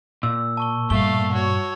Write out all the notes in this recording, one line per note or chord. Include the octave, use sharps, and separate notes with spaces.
A#2 E6
A5 C#6 G7
G2 A3 F5 G7
F#4 C#5